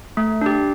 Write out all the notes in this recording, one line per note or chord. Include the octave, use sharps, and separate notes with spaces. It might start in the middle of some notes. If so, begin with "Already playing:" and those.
A3
D4 G4